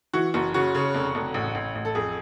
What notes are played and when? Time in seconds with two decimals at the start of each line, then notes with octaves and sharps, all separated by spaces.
0.13 E3 F#4
0.34 F#1 F#4
0.54 C#3 F#4
0.74 C#3
0.94 F1
1.15 F1
1.34 A1
1.55 A1
1.75 A1
1.85 A4
1.95 F2 G#4